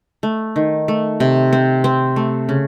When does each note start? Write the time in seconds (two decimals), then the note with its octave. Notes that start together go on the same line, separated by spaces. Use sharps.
0.23 A3
0.56 D#3
0.88 A3
1.20 C3
1.53 C4
1.84 C4
2.16 A3
2.49 C#3